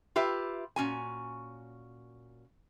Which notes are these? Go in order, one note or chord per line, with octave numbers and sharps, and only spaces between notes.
F4 G4 B4 E5
A#2 C#4 F#4 G#5